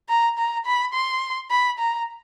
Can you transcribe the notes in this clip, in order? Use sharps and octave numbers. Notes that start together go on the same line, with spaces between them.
A#5
A#5
B5
C6
B5
A#5